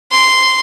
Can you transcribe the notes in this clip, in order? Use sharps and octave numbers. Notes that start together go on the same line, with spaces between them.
C6